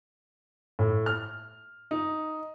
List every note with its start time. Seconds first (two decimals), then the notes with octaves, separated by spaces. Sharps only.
0.79 A2
1.06 F6
1.91 D#4